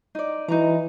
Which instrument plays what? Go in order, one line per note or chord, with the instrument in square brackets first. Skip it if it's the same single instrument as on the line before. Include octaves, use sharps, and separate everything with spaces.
[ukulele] D#4 D5
[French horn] E3 [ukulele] D#4 F#4 A#5